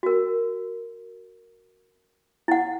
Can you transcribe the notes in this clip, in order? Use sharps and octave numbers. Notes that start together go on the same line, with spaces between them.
F#4 A#4
E4 F#5